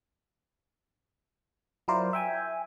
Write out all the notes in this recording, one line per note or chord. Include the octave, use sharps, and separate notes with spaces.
F#3 E4 F4 A#4 C5 D5
E5 G5 G#5